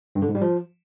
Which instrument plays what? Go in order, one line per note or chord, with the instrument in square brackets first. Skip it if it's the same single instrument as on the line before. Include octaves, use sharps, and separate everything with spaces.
[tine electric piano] G2
D3
G#2
G3
F3